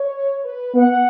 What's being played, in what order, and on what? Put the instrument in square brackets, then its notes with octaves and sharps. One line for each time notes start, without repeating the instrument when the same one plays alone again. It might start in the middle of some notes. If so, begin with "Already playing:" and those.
Already playing: [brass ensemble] C#5
B4
[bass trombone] B3 [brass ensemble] F#5